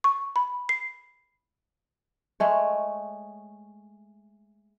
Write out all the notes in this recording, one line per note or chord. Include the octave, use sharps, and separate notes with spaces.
C#6
B5
C7
G#3 A3 C#5